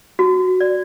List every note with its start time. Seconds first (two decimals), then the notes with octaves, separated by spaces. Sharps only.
0.19 F#4
0.60 D5